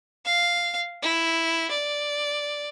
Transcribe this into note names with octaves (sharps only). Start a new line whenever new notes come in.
F5
E4
D5